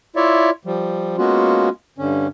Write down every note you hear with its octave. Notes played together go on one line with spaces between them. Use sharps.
E4 F4 C#5 D5 E5
F3 G3
G#3 A#3 B3 C#4 F4 F#4
G2 D3 C#4